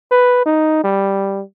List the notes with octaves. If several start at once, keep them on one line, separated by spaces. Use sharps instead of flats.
B4
D#4
G3